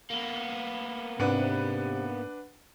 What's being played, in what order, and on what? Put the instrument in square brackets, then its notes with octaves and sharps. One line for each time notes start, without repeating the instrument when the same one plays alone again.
[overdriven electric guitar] A#3 B3
[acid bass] G#2 [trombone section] C3 [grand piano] D4 B4 F#5